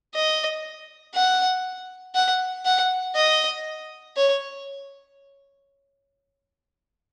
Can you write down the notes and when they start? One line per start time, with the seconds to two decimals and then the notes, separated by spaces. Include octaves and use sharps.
0.15 D#5
1.15 F#5
2.15 F#5
2.65 F#5
3.16 D#5
4.16 C#5